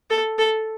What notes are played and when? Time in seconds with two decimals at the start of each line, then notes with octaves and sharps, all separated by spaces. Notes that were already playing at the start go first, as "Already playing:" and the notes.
0.10 A4
0.38 A4